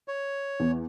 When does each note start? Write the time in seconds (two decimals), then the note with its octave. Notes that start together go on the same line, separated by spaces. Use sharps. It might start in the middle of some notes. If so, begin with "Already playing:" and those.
0.08 C#5
0.60 E2